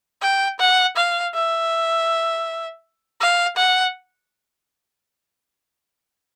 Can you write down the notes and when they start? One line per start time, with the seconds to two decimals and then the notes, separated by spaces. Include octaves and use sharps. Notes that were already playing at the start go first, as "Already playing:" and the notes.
0.22 G5
0.60 F#5
0.96 F5
1.34 E5
3.20 F5
3.57 F#5